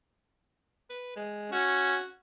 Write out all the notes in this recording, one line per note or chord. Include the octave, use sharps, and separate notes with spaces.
B4
G#3
C#4 F#4